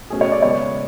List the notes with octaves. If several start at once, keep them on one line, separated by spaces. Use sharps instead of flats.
B2 A3 C#4 G#4
C#5
D5
C#3 G#3 B3 C#5